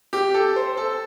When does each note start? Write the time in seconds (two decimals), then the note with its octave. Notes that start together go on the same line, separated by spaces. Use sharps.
0.13 G4
0.34 A4
0.56 C5
0.77 A4